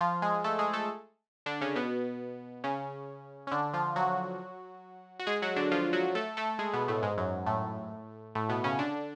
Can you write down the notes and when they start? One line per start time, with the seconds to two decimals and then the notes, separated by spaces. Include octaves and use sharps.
0.01 F3 F4
0.22 G#3 G#4
0.44 A3 A4
0.59 G#3 G#4
0.73 A3 A4
1.46 D3 D4
1.61 C#3 C#4
1.76 B2 B3
2.64 C#3 C#4
3.47 C#4
3.52 D3 D4
3.74 F3 F4
3.96 F#3 F#4
5.19 F#4
5.27 G#3 G#4
5.42 F#3 F#4
5.56 D3 D4
5.72 F3 F4
5.93 F#3 F#4
6.15 A3 A4
6.37 A3 A4
6.59 G#3 G#4
6.73 B2 B3
6.88 A2 A3
7.02 G#2 G#3
7.18 F#2 F#3
7.46 A2 A3
8.35 A2 A3
8.49 B2 B3
8.64 C#3 C#4
8.79 D3 D4